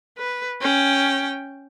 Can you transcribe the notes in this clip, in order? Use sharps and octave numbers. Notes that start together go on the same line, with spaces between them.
B4
C#4 G5